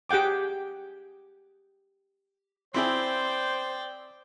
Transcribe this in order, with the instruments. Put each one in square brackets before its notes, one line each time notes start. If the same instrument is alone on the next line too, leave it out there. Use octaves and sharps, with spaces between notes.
[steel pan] G4 G#4 F#5 G5 D6
[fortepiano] C4 E4 G#4 [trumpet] C5 [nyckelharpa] D5 G5